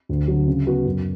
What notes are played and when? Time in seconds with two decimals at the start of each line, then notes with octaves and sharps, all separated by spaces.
0.09 D2
0.28 D3 F#3
0.48 C#3
0.67 F#3 B3 F#4
0.86 F#2